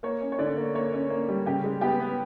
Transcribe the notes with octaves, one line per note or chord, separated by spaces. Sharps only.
A#3 C#5
C#4
C#5
D3 D5
A#3
A#3 C#5
C#4
A#3
G3
C#3 G4
G#3
B3 G4
B3